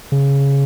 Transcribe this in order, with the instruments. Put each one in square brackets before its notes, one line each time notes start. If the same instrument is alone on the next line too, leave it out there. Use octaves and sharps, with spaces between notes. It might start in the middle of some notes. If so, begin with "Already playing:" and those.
[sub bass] C#3